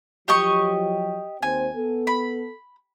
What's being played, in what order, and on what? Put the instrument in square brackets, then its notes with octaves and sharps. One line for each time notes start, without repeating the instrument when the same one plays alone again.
[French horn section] F3 F#3 [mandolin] G4 D#5 C#6
[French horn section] D#2 C4 C5 [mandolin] G#5
[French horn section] B3 A4
[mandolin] B5